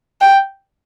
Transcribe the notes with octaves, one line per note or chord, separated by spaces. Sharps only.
G5